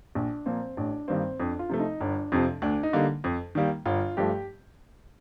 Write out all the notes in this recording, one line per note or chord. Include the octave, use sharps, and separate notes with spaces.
A#1 D4
A#2 F3 A#3 C4
A1 D4
G2 D#3 G3 A#3 C4
F2 D4
F4
C3 F3 A3
D#4
G1 D4
F2 C3 F3
D2 D4
D#4
D3 G3 A#3
F2
D#3 G3 A#3
G1 F4
G2 F3 A3 G4